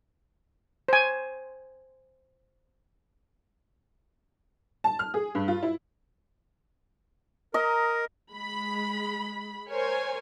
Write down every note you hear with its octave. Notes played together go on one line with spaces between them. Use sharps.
C5 G#5
A5
F6
G#4
G2
F4
E4
A#4 D#5 A#5
G#3 B5
A#4 C5 C#5 G#5